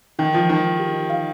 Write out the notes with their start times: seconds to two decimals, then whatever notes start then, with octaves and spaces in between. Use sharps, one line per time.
0.19 D#3 D#4
0.34 F3 C5
0.49 D#3 D#4
0.64 D#4
0.80 G4
0.96 D#4
1.10 F5